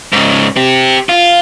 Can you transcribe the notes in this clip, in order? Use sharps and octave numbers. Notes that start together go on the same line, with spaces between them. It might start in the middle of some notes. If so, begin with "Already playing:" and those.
G#2 C#3
C4 G4
F4